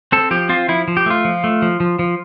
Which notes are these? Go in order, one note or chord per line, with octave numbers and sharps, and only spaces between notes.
C4 A4
F3 G4
C4 F4
F3 E4
F3
G4
A3 F4
F3
A3
F3
F3
F3